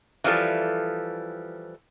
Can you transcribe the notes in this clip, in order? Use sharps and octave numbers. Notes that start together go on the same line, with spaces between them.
E3 F3 G3 A4